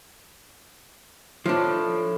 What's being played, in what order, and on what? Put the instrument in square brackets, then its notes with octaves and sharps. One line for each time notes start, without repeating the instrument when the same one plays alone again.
[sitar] A2 [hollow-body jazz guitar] F3 D4